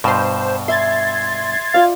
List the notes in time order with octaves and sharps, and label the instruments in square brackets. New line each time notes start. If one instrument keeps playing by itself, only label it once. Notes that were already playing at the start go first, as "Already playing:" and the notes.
[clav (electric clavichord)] G2 B2 [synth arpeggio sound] C5 E7
[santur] E5 [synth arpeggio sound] C6 G#6 A6
[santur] F4 D5 [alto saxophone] F5